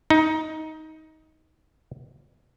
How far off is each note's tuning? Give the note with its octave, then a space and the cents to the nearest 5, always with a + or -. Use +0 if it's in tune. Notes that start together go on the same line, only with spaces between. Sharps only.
D#4 +15